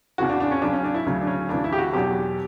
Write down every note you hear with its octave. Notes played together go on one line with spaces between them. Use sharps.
E2 C#3 E3 F#4
D4
D4
C#4
C#2 C#3 F#3 D4
C#4
D4
E4
D2 C#3 F#3
D4
C#4
D2 C#3 E3 D4
E4
G4
F#4
E2 B2 F#3 G4